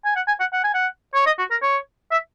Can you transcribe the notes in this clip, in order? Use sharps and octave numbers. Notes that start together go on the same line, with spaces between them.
G#5
F#5
G#5
F#5
F#5
G#5
F#5
C#5
D#5
F#4
A#4
C#5
E5